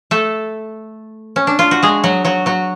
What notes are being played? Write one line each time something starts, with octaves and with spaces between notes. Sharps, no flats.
A3 A4
C#4
D4
F4
F#4
G#3 G#4
F#3 F#4
F#3 F#4
F#3 F#4